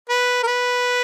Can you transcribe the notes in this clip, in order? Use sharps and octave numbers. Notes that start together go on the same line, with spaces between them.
B4
A#4
B4